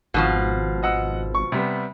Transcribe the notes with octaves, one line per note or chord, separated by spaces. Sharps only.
G#1 B2 D#3 F3
D#5 F#5 E6
C#6
C3 G3 B3